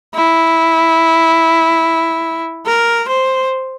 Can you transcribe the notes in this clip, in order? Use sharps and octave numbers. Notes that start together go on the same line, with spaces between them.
E4
A#4
C5